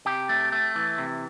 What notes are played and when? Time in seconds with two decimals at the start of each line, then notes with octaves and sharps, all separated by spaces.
0.06 C3 G4
0.29 A3
0.52 A3
0.76 E3
0.98 C3